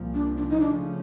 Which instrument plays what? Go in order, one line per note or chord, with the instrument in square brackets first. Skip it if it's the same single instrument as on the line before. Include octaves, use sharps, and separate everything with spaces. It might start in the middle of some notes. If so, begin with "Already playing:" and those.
Already playing: [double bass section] C2 A#2 F3
[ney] D4
D4
D#4
[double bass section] C#2 C#3 F3 A3 C#4 [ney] D4